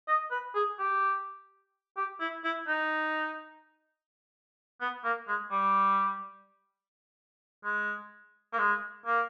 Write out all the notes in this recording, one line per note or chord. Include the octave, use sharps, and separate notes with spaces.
D#5
B4
G#4
G4
G4
E4
E4
D#4
B3
A#3
G#3
G3
G#3
A#3
G#3
A#3